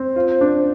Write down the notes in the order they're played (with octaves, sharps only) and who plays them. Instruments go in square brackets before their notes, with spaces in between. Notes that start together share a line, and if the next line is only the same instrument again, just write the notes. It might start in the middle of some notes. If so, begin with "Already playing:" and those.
Already playing: [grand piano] C4 [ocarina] C5
[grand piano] F4
D4